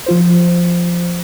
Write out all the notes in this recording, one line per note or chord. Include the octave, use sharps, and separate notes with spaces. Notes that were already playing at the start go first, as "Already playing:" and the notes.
F3 F4 C5